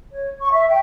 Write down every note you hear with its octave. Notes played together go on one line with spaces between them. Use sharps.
C#5
C#6
E5
G5